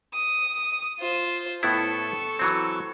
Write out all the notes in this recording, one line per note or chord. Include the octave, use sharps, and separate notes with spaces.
D#6
F4 C5
A2 B3 E4 A4 C#6
E3 F#3 C4